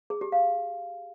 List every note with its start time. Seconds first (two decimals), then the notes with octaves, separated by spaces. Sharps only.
0.10 G#4
0.21 G4
0.32 F5